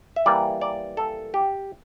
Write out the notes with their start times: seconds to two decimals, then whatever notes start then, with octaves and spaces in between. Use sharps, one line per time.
0.16 E5
0.26 E3 G3 A#3 D5
0.61 D5
0.97 A4
1.34 G4